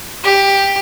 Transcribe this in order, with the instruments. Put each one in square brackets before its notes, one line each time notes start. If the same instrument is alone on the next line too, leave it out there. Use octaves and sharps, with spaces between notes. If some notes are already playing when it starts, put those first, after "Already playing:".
[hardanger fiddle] G4